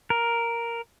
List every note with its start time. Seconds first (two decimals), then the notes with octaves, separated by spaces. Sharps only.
0.10 A#4